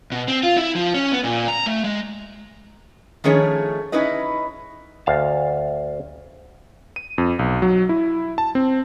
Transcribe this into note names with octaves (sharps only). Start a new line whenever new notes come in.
B2
C4
F4
E4
F3
C#4
B3
A#2
A#5
A3
G#3
D#3 F3 A3 C#4 G#4 C#5
C#4 D#4 E4 B4 D#5
D2 F5 A5
D#7
F2
B1
F#3
E4
A5
C4